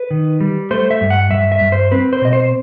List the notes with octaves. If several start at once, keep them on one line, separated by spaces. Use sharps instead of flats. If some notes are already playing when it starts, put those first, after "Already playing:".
Already playing: B4
D#3
G3
A3 C5
E5
G2
F#5
G2 E5
E5
G2
C5
C4 B4
C5
B2 D#5
C5